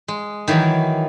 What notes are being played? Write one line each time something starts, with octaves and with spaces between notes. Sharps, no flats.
G#3
D#3 E3 F#3 A#3